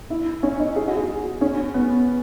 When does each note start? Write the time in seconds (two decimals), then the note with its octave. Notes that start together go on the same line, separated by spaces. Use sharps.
0.10 E4
0.43 C#4
0.59 D#4
0.76 G#4
0.88 F#4
0.97 G#4
1.41 C#4
1.74 B3